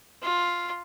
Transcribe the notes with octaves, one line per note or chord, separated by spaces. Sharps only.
F4